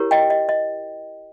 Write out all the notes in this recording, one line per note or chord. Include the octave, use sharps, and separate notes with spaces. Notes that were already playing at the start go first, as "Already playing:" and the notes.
Already playing: E4 G4 A#4 C#5
D#5 G5
D#5
D#5